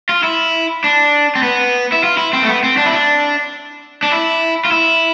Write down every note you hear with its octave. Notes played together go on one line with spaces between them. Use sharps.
F4
E4
D4
C4
B3
E4
F4
E4
C4
A3
B3
C4
D4
E4
D4
D4
E4
F4
E4